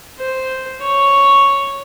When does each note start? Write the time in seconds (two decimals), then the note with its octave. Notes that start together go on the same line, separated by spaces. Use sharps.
0.18 C5
0.81 C#5